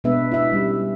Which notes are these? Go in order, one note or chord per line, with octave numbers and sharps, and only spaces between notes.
B2 G#3 B3 D4 B4 E5
E4 E5
G3 C#4